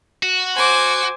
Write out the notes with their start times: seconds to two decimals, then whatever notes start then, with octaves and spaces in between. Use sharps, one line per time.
0.23 F#4
0.55 C5 G#5 D6